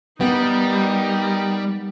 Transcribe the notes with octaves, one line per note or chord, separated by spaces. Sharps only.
G3 B3 D#4 A#4